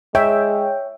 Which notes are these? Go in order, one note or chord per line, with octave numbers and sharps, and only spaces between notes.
G#3 C#5 E5 G5